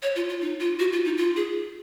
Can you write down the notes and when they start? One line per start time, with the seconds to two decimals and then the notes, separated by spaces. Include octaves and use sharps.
0.02 C#5
0.16 F4
0.29 F4
0.41 D#4
0.60 F4
0.79 F#4
0.93 F4
1.05 D#4
1.18 F4
1.36 G#4